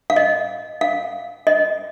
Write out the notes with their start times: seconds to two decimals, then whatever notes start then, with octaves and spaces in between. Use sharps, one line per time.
0.10 F5
0.16 D#5
0.81 F5
1.47 D#5